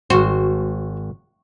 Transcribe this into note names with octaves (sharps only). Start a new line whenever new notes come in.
G#1 F#4 C5